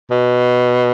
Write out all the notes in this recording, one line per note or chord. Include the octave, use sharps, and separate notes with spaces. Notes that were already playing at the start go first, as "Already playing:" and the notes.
B2